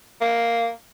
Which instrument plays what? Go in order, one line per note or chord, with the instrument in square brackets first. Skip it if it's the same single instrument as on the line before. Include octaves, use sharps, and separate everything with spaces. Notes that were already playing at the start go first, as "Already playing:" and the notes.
[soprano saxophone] A#3